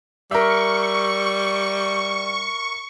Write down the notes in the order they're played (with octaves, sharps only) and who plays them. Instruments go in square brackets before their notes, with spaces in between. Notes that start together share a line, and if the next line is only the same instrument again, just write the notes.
[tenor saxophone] G3 [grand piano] A#4 E5 [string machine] C#6